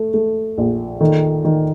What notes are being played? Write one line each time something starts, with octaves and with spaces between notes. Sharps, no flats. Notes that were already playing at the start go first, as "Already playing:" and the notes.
Already playing: A3
A3
A#1
D#3 A4
D#3